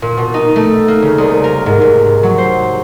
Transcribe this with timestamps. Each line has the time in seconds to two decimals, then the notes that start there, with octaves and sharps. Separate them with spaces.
0.02 A#2
0.17 B2
0.34 D#4
0.56 A3
0.88 A#3
1.02 C#3
1.18 C2
1.44 A#4
1.66 G#2
1.81 G#2
2.23 F#3
2.38 C5